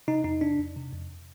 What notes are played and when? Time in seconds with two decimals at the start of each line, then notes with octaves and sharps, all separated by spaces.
0.08 C3 D#4
0.24 F2 D#4
0.41 C3 D4
0.58 F2
0.77 C3
0.92 F2